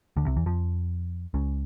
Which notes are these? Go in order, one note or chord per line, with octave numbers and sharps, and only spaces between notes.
D2 D3
C2 C3
E2 E3
F2 F3
C#2 C#3